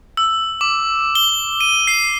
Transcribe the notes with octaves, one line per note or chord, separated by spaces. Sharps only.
E6
D6
G7
D#7
C7